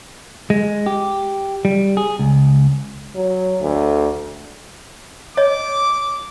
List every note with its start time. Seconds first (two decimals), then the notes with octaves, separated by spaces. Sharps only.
0.50 G#3
0.86 G4
1.65 G3
1.97 G#4
2.19 C#2
3.15 F#3
3.61 D2
5.37 C#5 D#5 D6